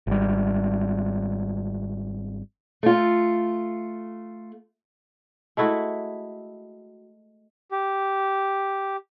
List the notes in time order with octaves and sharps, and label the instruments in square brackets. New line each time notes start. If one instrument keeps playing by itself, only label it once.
[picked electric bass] G#1 G3
[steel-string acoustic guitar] A3 F4
[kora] G#3 A3 E4 F#4
[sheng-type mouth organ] G4